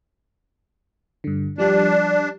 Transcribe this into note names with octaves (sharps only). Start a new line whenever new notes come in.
G2 D3
F3 G3 D4 G4